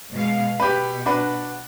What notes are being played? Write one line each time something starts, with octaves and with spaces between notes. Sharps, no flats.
B2 G#3 F5
B2 G4 B4
D4 F#4 B4